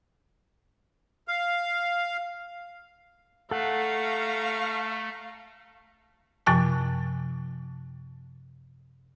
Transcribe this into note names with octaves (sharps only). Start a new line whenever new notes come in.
F5
A3 A4 F5 F#5 A#5 C#6
F#2 C3 F3 G#5 A5 D6